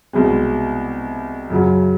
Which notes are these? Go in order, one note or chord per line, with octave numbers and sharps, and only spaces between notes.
C2 B2 G#3
F#2 C#3 F#3